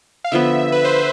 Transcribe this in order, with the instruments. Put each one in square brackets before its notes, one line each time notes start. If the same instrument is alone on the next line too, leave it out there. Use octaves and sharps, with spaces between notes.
[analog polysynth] F5
[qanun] D3 F3 B3 [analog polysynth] E5
[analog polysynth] B4
C5